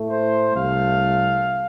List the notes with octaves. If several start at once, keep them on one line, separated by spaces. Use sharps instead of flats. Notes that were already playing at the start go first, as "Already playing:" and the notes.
Already playing: A2 A3
C5
C2 C3 A3 F5